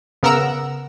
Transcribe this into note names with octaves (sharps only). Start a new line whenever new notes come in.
C#3 B3 A#4 F#5 A#5 E6